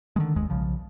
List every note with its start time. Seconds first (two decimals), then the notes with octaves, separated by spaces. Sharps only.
0.16 D3 D#3 G#3
0.35 F#1 D#2 G#3
0.50 B1 C#3 F3